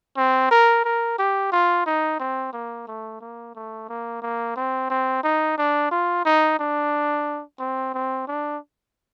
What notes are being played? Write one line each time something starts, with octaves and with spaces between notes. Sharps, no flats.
C4
A#4
A#4
G4
F4
D#4
C4
A#3
A3
A#3
A3
A#3
A#3
C4
C4
D#4
D4
F4
D#4
D4
C4
C4
D4